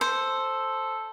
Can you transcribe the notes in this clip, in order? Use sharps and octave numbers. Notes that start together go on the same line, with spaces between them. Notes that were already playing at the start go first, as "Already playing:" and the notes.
A4 C5